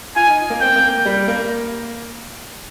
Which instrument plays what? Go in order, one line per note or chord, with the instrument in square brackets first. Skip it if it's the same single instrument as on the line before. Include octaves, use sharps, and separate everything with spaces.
[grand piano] F4 [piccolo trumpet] G#5
[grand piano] D#4
A#3
[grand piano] C4 [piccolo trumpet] G5
[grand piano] A#3
G3
A#3